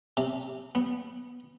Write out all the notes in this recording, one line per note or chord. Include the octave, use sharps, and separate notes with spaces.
C3
B3